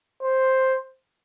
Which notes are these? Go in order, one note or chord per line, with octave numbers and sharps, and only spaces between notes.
C5